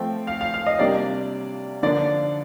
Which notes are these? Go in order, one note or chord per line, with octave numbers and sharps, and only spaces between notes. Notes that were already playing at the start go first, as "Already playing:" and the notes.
Already playing: F3 A3 C4 G5
F5
F5
F5
D#5
C3 G3 A#3 D4 D5
D3 F3 A#3 D4 D5